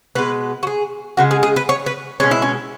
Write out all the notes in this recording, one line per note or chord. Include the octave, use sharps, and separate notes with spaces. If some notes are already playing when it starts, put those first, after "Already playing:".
B2 G#3 B4
F#4
G#4
C#3 G#3 F#4
G#4
G#4
B4
C#5
B4
B2 G#3 C#4
E4
C#4